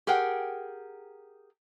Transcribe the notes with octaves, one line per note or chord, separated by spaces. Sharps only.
G4 G#4 A#4 F#5 G5